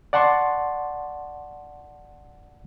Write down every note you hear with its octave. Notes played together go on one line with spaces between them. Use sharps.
D5 F#5 A5 C6 C#6